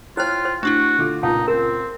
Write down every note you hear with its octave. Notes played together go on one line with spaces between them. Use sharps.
E4 F4 C5 C#5 G5 F6 F#6
C5
A3 D4 E4 F#4 C#6 F#7
D3 F4 D6
C#2 A#2 D#4 F5 A5
C4 A#4